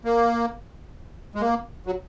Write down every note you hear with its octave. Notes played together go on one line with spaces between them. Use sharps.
A#3
G#3
A#3
F#3